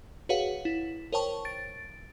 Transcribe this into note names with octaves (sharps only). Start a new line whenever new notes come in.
F#4 G#4 B4 C#5 F5 F#5
E4
A#4 C5 C#5 G5 A5 C#6
A6 D7